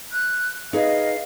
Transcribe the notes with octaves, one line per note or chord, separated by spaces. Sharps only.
F#6
D#4 G#4 B4 D#5 F5